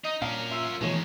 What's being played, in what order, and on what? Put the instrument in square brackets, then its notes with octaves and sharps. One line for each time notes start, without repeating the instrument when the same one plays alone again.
[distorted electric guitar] D#4 [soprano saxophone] D#5
[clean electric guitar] A#2 F5 [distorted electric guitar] C#4 A#4 [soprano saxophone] D4
[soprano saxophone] F4 [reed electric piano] E5 C6 E6
[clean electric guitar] B2 C#5 [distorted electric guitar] D#3 G#3 [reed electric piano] E3 A3 D#4